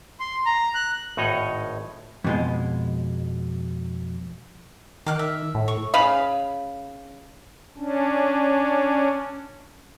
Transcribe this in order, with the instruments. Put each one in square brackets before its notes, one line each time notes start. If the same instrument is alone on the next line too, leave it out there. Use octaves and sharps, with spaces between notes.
[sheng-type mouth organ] C6
A#5
F#6
[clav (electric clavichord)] G#1 A2 D#4 C#5 D#5 F#5
[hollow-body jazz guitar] F2 B2 G#3
[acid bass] D#3 [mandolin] D6 F6 F#6
[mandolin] E5
[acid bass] A2
[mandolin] C#6
[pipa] C#3 F5 B5
[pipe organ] C#4 D4